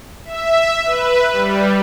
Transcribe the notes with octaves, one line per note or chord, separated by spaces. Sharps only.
E5
B4
G3